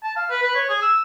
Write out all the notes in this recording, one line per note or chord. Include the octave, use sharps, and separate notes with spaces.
A5
F5
B4
B4
C#5
G#4
E6